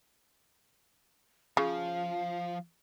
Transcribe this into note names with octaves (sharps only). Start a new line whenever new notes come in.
C#3 F3 F5